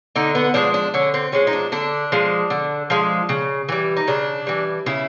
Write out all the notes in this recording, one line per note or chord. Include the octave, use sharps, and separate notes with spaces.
D3 D#4
B3
F3 G#3 D4
D4
D3 C#4
C4
F3 G#3 C#4
D#4
D4
D3 D4
F3 G#3
D3
F3 G#3
C#3
E3 G3
D#4
C#3 D4
E3 G3
C#3 E4